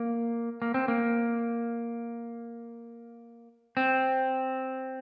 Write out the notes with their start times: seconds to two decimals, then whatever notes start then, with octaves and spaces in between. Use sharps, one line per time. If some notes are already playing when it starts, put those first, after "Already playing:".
Already playing: A#3
0.62 A#3
0.74 C4
0.88 A#3
3.77 C4